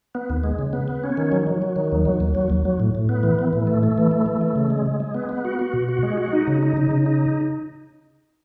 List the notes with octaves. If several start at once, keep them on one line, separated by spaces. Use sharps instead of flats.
B3
D#2
G#3
C#3
B3
B3
C#4
D#3
F#3
F#3
F#3
D#3
D#2
F#3
D#2
F#3
D#2
F#3
A2
A2
B3
E3
E3
A2
A3
A3
E3
A3
E3
A3
C#3
G#3
G#3
G#3
B3
B3
F#4
F#4
B2
F#4
G#3
F#4
D#4
C#3
D#4
C#3
C#3
D#4